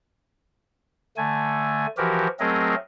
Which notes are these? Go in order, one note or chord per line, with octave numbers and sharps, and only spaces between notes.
D3 A3 G#5
E3 F3 F#4 G4 A#4
F#3 A3 C4 G#4 A#4 D#5